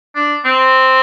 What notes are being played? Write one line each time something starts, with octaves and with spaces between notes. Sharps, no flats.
D4
C4